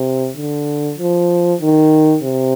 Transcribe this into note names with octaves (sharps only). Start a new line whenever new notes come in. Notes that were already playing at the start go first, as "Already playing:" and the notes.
Already playing: C3
D3
F3
D#3
C3